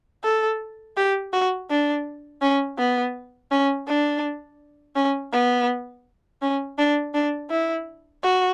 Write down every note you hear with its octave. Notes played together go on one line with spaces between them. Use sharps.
A4
G4
F#4
D4
C#4
B3
C#4
D4
C#4
B3
C#4
D4
D4
E4
F#4